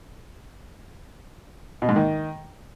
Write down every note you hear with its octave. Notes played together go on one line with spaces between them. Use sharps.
B2
G#2
D#3